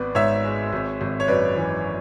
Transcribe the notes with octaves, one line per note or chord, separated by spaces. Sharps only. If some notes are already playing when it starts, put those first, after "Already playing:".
Already playing: G#1 B3 B4 D5
G#2 C#5 E5
G#3
G#1
G#1
C#5
F#2 B4 D5
E3